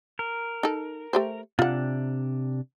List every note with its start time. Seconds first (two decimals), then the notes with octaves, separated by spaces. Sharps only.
0.19 A#4
0.63 D#4 A4
1.13 A3 G4 C5
1.59 C3 D4 F4 F#5